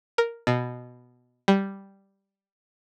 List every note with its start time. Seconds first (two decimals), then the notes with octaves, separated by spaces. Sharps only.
0.18 A#4
0.47 B2
1.48 G3